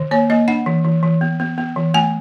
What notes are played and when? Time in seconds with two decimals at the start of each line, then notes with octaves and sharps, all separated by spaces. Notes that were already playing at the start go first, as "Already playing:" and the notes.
Already playing: D#3
0.11 A#3 C#5
0.29 A#3 D#5
0.48 D4 F#5
0.66 E3
0.85 E3
1.03 E3
1.21 B3
1.40 B3
1.58 B3
1.76 E3
1.94 A3 G#5